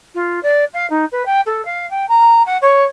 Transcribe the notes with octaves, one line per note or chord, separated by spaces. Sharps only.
F4
D5
F5
D#4
B4
G5
A4
F5
G5
A#5
F#5
C#5